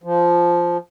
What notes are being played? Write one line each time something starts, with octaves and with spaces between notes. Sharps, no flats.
F3